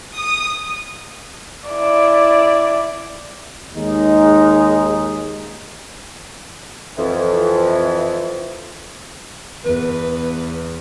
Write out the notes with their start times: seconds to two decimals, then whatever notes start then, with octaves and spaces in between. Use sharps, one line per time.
0.18 D#6
1.70 E4 D5
3.75 D#2 G#3 D#4
6.98 F2 E3
9.65 E2 B4